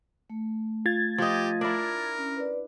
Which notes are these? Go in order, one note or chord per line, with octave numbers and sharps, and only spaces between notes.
A3
F4 G#6 A6
F3 G4 D#5
D4 E4 A#4
C#4
B4 D5